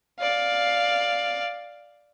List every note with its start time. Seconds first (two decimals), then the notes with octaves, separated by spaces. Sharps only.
0.19 D5 F5